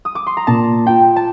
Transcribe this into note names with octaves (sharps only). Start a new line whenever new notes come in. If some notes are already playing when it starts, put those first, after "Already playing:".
D#6
D6
C6
A#5
A#2 A5
F4 G5
A5